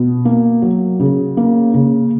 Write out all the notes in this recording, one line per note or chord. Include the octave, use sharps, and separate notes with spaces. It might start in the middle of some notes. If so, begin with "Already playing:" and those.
Already playing: B2
A#3
F#3
C#3
A#3
C#3